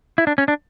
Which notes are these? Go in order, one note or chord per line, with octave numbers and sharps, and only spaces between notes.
E4
D4
C#4
D4